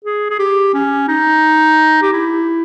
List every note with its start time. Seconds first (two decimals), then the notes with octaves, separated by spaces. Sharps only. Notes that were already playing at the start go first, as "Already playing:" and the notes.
0.05 G#4
0.30 G#4
0.39 G4
0.74 C#4
1.08 D#4
2.02 G4
2.12 E4